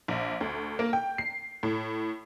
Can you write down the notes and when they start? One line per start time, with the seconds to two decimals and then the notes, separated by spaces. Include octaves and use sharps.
0.08 A#1
0.41 D2
0.79 A#3
0.93 G5
1.18 C7
1.63 A2